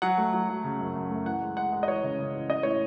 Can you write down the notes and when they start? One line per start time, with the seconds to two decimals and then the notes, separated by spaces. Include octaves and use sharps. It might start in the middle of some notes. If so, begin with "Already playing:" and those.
0.02 F#3 F#5
0.18 A3
0.34 F#3
0.49 F#3
0.64 C#3
0.80 F#2
0.95 F#2
1.10 A3
1.26 E3 F#5
1.42 G#3
1.57 G#3 F#5
1.72 G#3
1.83 D#5
1.88 E3 C#5
2.03 C#3
2.19 C#3
2.34 E3
2.50 C#4 D#5
2.63 A2 C#5